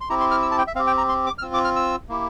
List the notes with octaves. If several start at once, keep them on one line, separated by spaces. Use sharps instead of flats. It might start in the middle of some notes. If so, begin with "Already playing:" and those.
C6
C4 E4 G4 A#5
C6
F6
E6
A5
G5
E5
C4 G4 F5
G5
A#5
C6
D6
F6
C4 F4 E6
D6
F6
E6
A#3 E4 G4